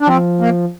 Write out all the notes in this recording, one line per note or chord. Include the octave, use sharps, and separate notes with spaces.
D4
F3 C4
A#3